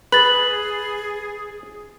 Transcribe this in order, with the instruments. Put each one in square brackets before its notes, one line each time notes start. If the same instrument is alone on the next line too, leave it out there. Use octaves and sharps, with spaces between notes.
[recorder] G#4 [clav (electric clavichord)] B4 [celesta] A6 F#7